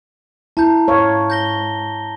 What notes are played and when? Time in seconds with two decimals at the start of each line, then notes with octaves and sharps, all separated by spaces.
0.57 E4 A5 A#5 G6
0.88 G#2 C#5 F5
1.30 G6 A#6 G7